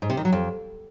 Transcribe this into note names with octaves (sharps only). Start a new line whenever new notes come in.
G#2
C3
D#3
F#3
F2